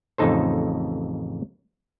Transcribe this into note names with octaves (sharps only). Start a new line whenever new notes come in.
A1 F2 C#3 D#4 A4 C5